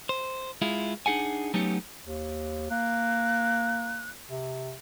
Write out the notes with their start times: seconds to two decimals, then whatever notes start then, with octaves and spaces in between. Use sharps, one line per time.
0.09 C5
0.62 G#3 E4 F4
1.06 D4 D#4 G#4 F#5 G#5
1.54 F#3 A3 B3 C#4 D#4 G4
2.07 D#2
2.71 A#3 F#6
4.29 C3